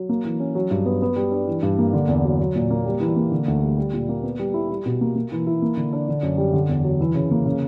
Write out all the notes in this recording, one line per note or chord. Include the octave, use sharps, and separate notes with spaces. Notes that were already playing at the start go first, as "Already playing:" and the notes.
Already playing: F#3
A#3
E3
C#4
F#3
G2
B3
B3
G3
D4
E3
G2
A#3
D3
E2
F#3
F#3
A#2
A#3
G3
E3
A#3
D3
D2
G3
G3
A#2
A#3
B3
G3
E4
G3
B2
A#3
A#3
E3
E4
A#3
D3
D4
D3
F#2
G3
D3
E2
F#3
E3
C#3
A#3
C#3